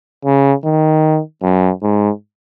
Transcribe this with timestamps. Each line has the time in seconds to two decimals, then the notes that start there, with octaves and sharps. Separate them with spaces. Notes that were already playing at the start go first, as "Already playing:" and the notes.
0.25 C#3
0.65 D#3
1.43 F#2
1.82 G#2